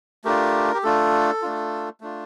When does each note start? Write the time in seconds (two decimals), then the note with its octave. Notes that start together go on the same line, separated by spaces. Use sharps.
0.25 A3 D4 F4 G4 A#4
0.74 G4
0.83 A3 D4 F4 A4
1.42 A3 D4 F4
2.01 A3 D4 F4